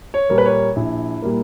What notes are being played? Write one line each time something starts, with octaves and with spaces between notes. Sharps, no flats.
C#5
A#2 G3 A#3
B4
C#5
A#1 E4
A#2 G3 A#3